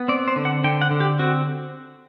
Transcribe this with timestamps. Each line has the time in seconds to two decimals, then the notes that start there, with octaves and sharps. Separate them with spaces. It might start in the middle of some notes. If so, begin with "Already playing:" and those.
Already playing: B3
0.08 C4 D5
0.28 C5
0.36 D3
0.45 F#5
0.64 D3 G5
0.81 F#5
0.91 D3
1.00 G4
1.19 C4 F#4